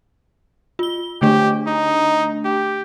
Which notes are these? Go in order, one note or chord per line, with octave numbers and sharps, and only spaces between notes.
F4 G7
D3 A3 D4 G4
D#4
G4